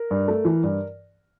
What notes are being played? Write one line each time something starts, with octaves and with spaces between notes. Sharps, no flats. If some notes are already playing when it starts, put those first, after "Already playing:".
Already playing: A#4
G2
A3
E3
G2